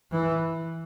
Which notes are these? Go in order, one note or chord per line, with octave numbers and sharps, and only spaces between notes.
E3